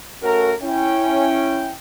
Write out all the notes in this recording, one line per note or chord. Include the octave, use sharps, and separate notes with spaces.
A3 C#4 F#4 A4 A#4
C#4 E4 G5